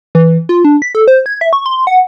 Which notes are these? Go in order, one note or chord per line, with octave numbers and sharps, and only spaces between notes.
E3
F4
D4
B6
A4
C5
G#6
E5
C#6
C6
F#5